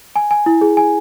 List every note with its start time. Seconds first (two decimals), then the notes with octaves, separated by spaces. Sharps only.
0.16 G#5
0.31 G#5
0.46 E4
0.61 G#4
0.77 G#5